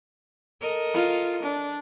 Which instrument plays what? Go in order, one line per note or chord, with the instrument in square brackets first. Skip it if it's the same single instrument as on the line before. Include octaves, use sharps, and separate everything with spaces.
[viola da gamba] A4 A#4 D#5
[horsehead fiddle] F4
D4